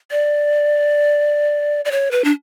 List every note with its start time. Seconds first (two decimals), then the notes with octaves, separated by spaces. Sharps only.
0.11 D5
1.85 D5
1.91 C#5
2.11 B4
2.24 D4